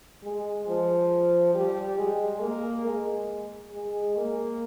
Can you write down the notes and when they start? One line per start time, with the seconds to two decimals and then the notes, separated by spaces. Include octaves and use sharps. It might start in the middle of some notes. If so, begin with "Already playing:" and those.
0.23 G#3
0.67 F3
1.54 G3
1.98 G#3
2.41 A#3
2.85 G#3
3.72 G#3
4.16 A#3